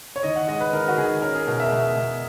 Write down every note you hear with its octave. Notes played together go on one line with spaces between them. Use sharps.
C#5
D#3 D#5
F#5
G#3 D#5
B4
D#3 A#4
F#4
D#3 G#4
C#4 A#4
G#4
B2 A#4
E5
B2
B2